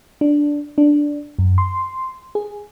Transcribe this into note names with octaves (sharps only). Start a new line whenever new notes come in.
D4
D4
F#2
C6
G#4